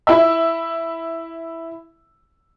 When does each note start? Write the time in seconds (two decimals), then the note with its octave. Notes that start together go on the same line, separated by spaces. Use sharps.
0.07 E4 E5